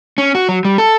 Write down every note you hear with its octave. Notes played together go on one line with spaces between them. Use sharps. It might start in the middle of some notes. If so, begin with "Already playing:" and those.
C#4
F#4
F#3
G3
A4